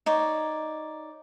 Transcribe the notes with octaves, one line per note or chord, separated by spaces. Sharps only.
D#4 C#5 D5